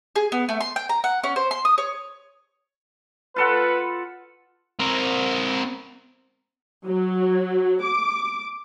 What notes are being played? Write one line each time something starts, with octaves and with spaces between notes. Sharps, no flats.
G#4
B3
A3
C6
G5
A#5
F#5
C#4
C5
C6
D#6
C#5
F4 A4 B4 F#5
C4 A#4
F#3
D6